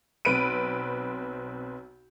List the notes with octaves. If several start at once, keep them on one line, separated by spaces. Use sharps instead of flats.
B1 C4 B4 B5 D7 D#7